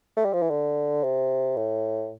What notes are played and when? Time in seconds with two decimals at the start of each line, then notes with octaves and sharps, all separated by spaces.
0.17 A3
0.25 G3
0.33 F3
0.42 E3
0.50 D3
1.03 C3
1.57 A2